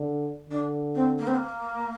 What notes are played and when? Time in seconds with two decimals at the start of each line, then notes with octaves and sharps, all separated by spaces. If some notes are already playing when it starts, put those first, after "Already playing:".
Already playing: D3
0.50 D3 D4
0.95 C4
1.18 A#3
1.27 C4
1.35 A#3